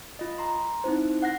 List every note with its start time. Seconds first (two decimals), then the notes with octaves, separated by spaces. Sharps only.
0.19 F4 D#5
0.38 A#5 C6
0.84 C4 D#4 E4 C5
1.22 F#5 F#6 A#6